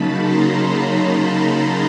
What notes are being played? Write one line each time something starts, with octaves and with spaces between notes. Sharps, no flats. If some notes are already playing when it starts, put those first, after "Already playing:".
Already playing: C#3 F#3 A#3 D#4 A5 B5
A#5 C6